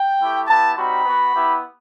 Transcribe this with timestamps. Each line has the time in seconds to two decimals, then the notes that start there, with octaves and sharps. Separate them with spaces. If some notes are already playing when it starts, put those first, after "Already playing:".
Already playing: G5
0.19 A3 E4 G4
0.47 B3 E4 G4 A5
0.76 G3 C4 D#4 F#4 B5
1.04 B3 F#4
1.33 B3 E4 G4